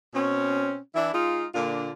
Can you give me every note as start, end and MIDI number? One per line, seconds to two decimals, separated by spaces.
0.14 0.77 47
0.14 0.77 60
0.14 0.77 61
0.94 1.12 52
0.94 1.12 62
0.94 1.12 64
1.13 1.44 56
1.13 1.44 63
1.13 1.44 65
1.54 1.90 46
1.54 1.90 50
1.54 1.90 58
1.54 1.90 62
1.54 1.90 65